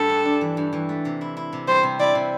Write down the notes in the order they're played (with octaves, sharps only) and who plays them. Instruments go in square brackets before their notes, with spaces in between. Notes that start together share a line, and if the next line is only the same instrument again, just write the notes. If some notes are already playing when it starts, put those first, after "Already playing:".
Already playing: [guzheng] G2 A3 [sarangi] A4
[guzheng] D4
D4
E3
G2
E3
A3
C3
E4
E4
C3
[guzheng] G3 [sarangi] C5
[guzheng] C3
[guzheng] E4 [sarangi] D5
[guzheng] C3